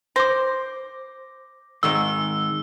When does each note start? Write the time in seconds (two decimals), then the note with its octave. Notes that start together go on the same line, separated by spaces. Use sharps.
0.16 C5 D6 A#6
1.83 G#2 D#3 G#3 E6